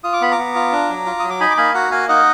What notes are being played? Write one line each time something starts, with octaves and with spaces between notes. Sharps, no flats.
F4 D#6
D6
B3 B5
A#5 D6
B3
F4
D4
F#3
F4
F#3 D#6
D6
D#4 G#5 B5
D6
A#3 G#5 B5
F#4 F#5 A#5
A#3 F5 G#5
D#4 D#5 F#5